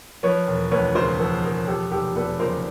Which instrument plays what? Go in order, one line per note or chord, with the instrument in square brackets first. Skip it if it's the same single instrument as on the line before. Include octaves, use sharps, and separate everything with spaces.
[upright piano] F3 B4 C#5
E1
D2 B4 C#5
C#3 A#4 C5
F3 A4 B4
E1 G#4 A#4
F3 G4 A4
F1 G4 A4
E2 A4 B4
C#3 A#4 C5